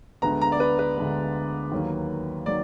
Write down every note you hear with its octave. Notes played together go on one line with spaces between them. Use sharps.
D2 D3 G#3 B3 A#5
A#5
D5
B4
B4
D2 D3 G#3 B3
D#2 D#3 F#3 A#3
D#3 F#3 A#3 D5